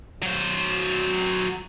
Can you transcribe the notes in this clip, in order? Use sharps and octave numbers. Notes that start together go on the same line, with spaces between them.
F#3 C5